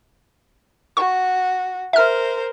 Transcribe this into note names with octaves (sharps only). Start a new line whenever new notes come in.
F#4 C#6
A#4 C5 E5 F6